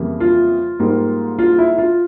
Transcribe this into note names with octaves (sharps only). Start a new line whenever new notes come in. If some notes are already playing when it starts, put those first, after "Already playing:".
Already playing: F2 C#3 E3 G3 A#3
F4
G#2 G3 A#3
F4
E4
F4